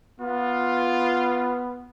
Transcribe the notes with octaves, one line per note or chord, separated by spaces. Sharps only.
B3 F4